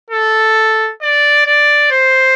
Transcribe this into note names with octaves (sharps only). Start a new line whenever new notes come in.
A4
D5
D5
C5